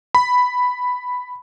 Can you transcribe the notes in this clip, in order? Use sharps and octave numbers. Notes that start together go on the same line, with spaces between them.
B5